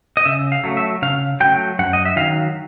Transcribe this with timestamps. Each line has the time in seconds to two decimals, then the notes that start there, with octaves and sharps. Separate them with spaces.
0.17 D#5
0.25 C#3 E5
0.52 F5
0.64 F#3 A3
0.77 E5
1.02 C#3 F5
1.40 F#3 A3 G5
1.79 F#2 F#5
1.93 D#5
2.05 E5
2.16 D#3 F#3 F5